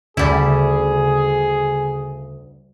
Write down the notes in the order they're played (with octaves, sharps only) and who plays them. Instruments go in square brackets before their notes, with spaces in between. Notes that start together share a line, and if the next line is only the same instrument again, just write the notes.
[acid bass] D2 [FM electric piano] C#3 [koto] G3 E4 [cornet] G#4